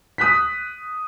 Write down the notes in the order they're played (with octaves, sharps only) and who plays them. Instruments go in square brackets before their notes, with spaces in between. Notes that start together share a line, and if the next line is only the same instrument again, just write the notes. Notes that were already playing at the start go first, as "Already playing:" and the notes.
[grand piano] D#6 F#6 B6